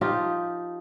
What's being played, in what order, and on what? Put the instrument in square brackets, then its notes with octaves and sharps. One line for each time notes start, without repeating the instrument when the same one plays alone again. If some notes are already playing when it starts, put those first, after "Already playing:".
[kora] F3 D#4 F4 G4